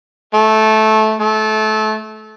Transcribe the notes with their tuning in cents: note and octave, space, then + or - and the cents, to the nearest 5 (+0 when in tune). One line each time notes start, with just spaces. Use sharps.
A3 -15
A3 -25